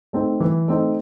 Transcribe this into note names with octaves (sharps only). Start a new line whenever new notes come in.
A3 C4 D#4
E3
A3 C4 D#4